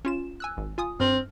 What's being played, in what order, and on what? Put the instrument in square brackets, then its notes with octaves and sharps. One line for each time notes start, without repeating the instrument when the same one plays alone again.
[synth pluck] C#4 F4 E7
G#5 E6 F#6
G#1
F4 G#5 D#6
[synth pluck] G2 F6 [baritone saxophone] C4